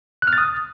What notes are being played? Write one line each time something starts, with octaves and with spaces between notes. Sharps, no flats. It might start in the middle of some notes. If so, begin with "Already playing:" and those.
F#6
F6
A6
D#6